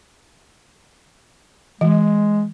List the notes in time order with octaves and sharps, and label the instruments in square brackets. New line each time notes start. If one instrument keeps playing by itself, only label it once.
[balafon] E3 [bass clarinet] G#3